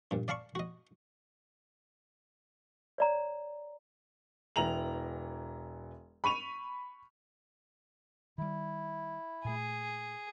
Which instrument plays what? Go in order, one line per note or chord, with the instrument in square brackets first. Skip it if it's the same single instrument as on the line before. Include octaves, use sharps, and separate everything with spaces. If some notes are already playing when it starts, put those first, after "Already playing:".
[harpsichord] G2 A#2
D5 F5 A5 B5 C#6
F#4 D#5
[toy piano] C#5 D5 A#5
[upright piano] E1 E3 A#5 F7 F#7
B5 C#6 D#7 F7
[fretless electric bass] D#3 G3 [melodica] E4
[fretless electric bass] A#2 A3 [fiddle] G#4